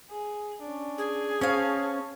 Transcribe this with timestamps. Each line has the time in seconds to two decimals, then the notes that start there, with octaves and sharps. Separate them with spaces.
0.11 G#4
0.62 C#4 D4
0.98 G#4
1.41 C4 C#4 F5 A5 C#6